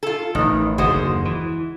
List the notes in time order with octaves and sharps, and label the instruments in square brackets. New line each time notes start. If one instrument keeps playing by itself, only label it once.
[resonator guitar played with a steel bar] F4 A4
[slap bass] A1 [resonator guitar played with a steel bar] D#3
[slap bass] F#1 D#2 D3 [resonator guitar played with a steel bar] G#3 F#4 C5
[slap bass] E3